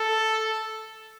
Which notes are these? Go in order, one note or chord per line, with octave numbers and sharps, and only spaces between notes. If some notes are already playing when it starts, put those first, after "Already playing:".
Already playing: A4